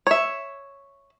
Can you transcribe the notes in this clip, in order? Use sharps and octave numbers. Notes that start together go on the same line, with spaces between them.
C#5 E5